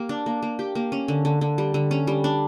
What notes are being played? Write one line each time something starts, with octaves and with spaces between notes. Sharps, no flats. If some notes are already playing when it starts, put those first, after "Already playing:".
Already playing: A#3 G4
D4
A#3
A#3
G4
A#3
C#4
D3
D3
D3
G3
D3
C#4
G3
D4